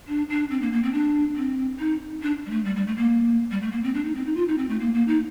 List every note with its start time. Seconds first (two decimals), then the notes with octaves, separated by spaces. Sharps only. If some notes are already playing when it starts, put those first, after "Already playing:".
0.07 D4
0.29 D4
0.50 C4
0.61 A#3
0.72 A#3
0.83 C4
0.93 D4
1.36 C4
1.79 D#4
2.22 D4
2.46 G3
2.50 A3
2.64 G3
2.75 G3
2.87 A3
2.96 A#3
3.51 G3
3.62 A3
3.71 A#3
3.83 C4
3.94 D4
4.04 D#4
4.15 C4
4.26 D#4
4.36 F4
4.48 D#4
4.57 C4
4.69 A3
4.80 A#3
4.93 A#3
5.07 D#4